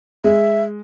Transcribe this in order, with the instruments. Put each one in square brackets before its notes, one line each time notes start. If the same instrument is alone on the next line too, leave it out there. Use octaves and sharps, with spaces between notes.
[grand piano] G#3 [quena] E5